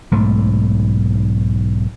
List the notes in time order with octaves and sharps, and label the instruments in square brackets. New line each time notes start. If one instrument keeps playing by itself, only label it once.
[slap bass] B1 G#2 A3